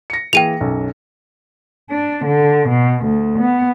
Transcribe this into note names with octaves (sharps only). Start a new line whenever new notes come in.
A#6 C#7
E3 A#3 G#4 G5 D#7 F7
B1 F#2
D4
D3
B2
D2
B3